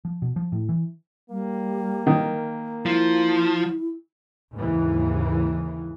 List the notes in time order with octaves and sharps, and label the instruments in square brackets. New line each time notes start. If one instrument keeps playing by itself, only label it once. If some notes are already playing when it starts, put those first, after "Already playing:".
[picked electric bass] F3
B2
F3
A2
E3
[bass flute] G3 [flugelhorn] A#3
[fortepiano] D#3
[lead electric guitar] F3 [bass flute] E4
[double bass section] D#2 G#2 C#3 E3